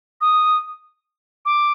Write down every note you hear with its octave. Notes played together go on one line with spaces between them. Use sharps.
D#6
D6